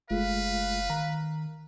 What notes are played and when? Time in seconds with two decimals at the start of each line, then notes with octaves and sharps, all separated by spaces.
0.10 F#1 G#3 A3 F4 B4 F5
0.90 D#3 A#5